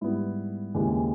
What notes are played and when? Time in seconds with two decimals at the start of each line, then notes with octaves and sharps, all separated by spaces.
0.01 G#2 G3 B3 E4
0.74 D#2 C#3 E3 G#3